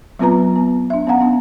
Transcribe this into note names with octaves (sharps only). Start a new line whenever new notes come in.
F#3 B3 C4 F4 B4 A#5
B3
D4 E5
B3 C#4 F5 F#5 A#5
B3 D4